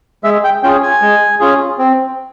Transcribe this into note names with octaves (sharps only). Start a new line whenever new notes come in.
G#3 E5
G5
C#4 F4 G#4 G5
G#5
G#3
C#4 F4 G#4
C4